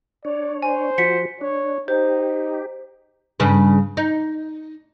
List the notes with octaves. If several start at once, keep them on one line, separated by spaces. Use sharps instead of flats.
D4 C#5 D5
C5 G#5
F3 F#4 B6 C#7
D4 C#5
D#4 G4 C5
G2 C#3 B4
D#4